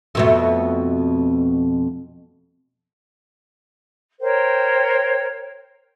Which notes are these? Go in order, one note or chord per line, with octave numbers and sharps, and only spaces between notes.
F2 B2 A3
A#4 C5 C#5 G5